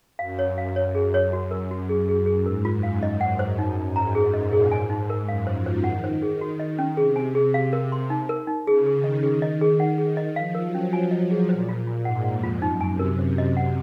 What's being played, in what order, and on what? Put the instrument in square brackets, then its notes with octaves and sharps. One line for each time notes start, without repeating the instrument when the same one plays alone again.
[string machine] F#2 [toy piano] F5
[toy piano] C#5
F5
[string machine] F#2 [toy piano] C#5
[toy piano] G#4
C#5
[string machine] F#2 [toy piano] F#4
[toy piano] A#4
F#4
G#4
G#4
G#4
[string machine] G#2 [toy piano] A#4
[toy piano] F4
[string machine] F#2
[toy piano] F5
[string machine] F#2 [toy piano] D#5
[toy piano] F#5
C5
[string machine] F#2 [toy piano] D#4
[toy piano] D#4
[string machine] G#2
[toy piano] A#5
[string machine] F#2 [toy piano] G#4
[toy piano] D#5
[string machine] A#2
[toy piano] G#4
[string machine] G#2 [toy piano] G#5
[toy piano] D#4
A#4
[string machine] F#2 [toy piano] F5
[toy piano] C5
[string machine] F3
[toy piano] C5
[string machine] D#3 [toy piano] F#5
[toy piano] C5
G#4
F#4
D#5
C#4
[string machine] C3 [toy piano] G#4
[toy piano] G#5
G#4
F5
A#4
C6
D#4
A#4
D#4
[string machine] C#3 [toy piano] G#4
[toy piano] G#4
[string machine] D#3
[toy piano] D#5
G#4
D#5
G#4
F#5
G#4
D#5
[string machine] F3 [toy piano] F5
[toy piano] A#4
[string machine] F#3
[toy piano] C#4
[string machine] F#3 [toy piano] G#5
[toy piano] D#5
[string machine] F#3
[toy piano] G#4
[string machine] A#2 [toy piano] C5
[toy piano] F4
F4
[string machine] G#2 [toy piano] F#5
[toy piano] F#5
[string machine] F2
[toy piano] F4
[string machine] F#2 [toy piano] D#4
[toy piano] G#5
[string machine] C3
[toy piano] A#4
[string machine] C3 [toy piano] C5
[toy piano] D#5
[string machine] C3
[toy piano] F#5